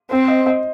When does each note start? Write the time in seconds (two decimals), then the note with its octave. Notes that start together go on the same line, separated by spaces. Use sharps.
0.11 C4 C5
0.28 D#5
0.46 D#5